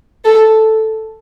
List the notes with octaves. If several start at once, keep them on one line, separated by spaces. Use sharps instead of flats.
A4